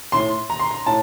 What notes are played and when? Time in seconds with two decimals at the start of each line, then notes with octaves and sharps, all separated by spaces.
0.12 A2 C6
0.50 A#5
0.59 C6
0.71 A#5
0.86 A2 A5